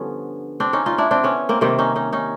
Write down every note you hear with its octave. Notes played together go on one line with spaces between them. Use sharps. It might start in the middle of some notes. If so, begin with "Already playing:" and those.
Already playing: G2 D3 F3 B3 C#4
C4 D4
C#4 D#4
D#4 F4
D4 E4
C4 D4
B3 C#4
A#3 C4
C3 D#3 G3 A#3 C4
C#4 D#4
C#4 D#4
C#4 D#4